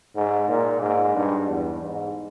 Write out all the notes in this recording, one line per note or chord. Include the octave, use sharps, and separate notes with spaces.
G#2
A#2
G#2
G2
E2
G#2